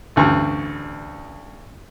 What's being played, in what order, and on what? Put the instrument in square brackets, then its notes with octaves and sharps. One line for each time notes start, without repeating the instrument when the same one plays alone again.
[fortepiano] A1 D2 G2 C#6